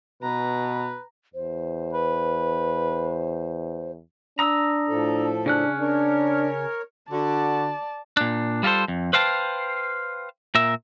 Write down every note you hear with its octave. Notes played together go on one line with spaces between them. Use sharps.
B2 B4 A#5
E2 C5
B4
D4 A#5 D#6 E6
A2 F3 A4
C#3 C#4 D4 F#6
D4 A#4 C#5
D3 F#4 D5 A5
A#2 D4
G3 F4 F#4 A4 C5
F2
B4 C5 F5 G5 A5
A#2 A#4 E5